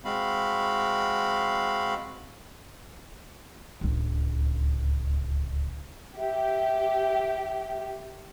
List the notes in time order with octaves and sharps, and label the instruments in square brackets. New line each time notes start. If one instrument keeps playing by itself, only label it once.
[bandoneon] G#3 C4 F#4 F5 B5
[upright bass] D1 C#2
[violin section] G4 [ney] E5